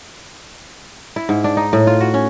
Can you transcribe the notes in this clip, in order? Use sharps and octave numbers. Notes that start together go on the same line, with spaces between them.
E4
G#2
D4
D#4
A2
F4
F#4
C#4